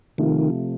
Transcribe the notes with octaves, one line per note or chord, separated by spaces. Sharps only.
C3 D#3 F3 A3